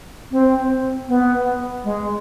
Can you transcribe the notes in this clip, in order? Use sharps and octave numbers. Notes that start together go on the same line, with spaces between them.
C4
B3
G#3